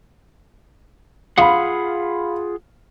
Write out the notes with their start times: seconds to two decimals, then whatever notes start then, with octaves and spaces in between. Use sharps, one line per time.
1.38 F4 G#4 F5 F#5 B5